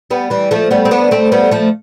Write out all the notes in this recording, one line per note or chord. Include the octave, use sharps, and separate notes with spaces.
G3 B3
E3 G3
F3 A3
G3 B3
C4
B3 D4
A3 C4
G3 B3
F3 A3